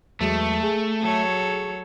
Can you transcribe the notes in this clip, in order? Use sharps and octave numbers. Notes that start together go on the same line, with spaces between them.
E2 F#3 G#3 A3
G#4
F#3 A4 C#5